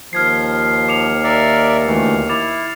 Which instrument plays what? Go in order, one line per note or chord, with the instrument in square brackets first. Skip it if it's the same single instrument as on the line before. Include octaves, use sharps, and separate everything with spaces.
[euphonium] D#2 [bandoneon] F3 [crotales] F6 G#6 C7
[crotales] D6 C#7 F7
[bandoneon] A#4 D5 E5
D2 E3 A3
[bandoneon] E4 [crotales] D6 A6 F7